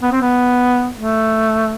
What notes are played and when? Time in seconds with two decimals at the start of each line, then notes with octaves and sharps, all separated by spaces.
0.03 B3
0.12 C4
0.22 B3
0.97 A3